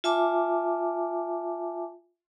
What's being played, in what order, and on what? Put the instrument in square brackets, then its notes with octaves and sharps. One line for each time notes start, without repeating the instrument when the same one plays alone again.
[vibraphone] F4 E5 G#5 A5 D6